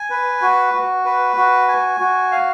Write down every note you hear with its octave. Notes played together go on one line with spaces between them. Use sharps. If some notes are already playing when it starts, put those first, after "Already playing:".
Already playing: G#5
B4
F#4
F#4
B4
F#4
G#5
F#4
F5